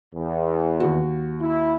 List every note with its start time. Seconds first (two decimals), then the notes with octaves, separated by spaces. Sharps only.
0.14 E2
0.80 D#2 F#4
1.41 E4